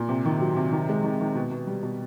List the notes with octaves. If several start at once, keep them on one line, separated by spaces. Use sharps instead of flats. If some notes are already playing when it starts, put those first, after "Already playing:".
Already playing: A#2
C3
D#3
F#3
C3
D#3
G#3
D#3
D#3
B2
B2
G3
B2